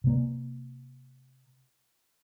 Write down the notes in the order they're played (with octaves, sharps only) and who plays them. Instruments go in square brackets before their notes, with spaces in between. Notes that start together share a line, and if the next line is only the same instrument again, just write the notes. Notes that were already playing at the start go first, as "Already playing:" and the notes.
[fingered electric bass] C3 A#3